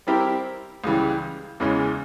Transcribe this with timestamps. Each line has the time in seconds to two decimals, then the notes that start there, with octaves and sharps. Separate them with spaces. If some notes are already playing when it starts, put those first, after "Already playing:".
0.07 G3 C4 E4 G4 A#4
0.84 C#2 C#3 E3 G3
1.60 E2 C#3 E3 G#3 C#4